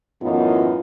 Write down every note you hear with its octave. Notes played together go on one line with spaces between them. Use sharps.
F#2 A2 E3 B3 D#4 F4